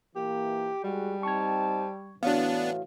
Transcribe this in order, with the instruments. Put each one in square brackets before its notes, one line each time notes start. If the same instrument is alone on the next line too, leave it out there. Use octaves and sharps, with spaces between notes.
[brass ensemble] A#2 E3 A#3 [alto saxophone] G4
[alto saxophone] G3 [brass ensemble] G#3 F#4 G#4
[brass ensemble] C4 D#4 A5 [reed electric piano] C#6 G#6
[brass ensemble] A2 E3 [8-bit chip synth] B3 D4 [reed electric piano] F#4 C#5 F5